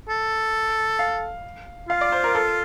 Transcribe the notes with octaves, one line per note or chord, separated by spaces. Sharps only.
A4
F5
F4 F5
D5
C5
A#4
A4